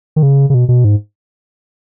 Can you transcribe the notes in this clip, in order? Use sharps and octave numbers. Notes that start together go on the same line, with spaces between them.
D#3
C#3
C#3
B2
B2
G#2